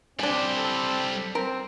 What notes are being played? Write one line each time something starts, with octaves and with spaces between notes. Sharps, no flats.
G3 C4 D4 C5 G#5
A4
C4 A#4